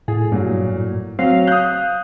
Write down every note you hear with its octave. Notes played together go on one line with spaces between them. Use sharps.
A2 G#4
G2 A#2 F#3
F#3 C4 F5
D#6 F#6 G6